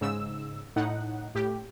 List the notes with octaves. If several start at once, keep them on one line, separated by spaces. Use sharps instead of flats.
G#2 C#3 E6
A2 D#4 F#5
A2 G4